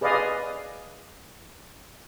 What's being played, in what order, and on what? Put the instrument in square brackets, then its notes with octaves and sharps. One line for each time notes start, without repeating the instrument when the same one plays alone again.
[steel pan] G#4 B4 D5 D#5 F5 G#5